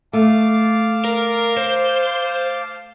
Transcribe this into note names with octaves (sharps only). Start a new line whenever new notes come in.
A3 F5 A5 D6
A#4
C5